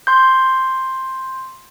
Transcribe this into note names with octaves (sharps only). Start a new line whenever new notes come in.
C6 G6